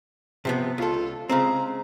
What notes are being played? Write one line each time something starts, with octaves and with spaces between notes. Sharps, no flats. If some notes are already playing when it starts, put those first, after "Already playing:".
C3 F3 B3
C#2 F4 A4
C#3 G#3 C4 A#5